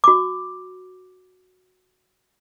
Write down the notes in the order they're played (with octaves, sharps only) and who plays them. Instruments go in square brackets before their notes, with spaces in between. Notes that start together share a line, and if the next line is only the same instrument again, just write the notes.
[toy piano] F#4 D6